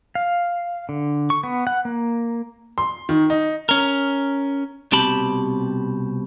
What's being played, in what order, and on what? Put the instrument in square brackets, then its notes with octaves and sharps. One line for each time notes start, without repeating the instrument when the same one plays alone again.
[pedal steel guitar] F5
D3
C#6
B3
F#5
A#3
[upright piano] C6
D#3
D#4
[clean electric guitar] C#4 A#4
C2 B2 C4 G4 A5 B5